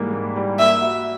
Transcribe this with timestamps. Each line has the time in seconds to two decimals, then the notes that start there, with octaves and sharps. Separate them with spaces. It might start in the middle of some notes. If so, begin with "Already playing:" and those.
Already playing: G#2 E3 G3 A#3
0.14 A#3
0.36 G3
0.59 A#3 E5
0.81 F#4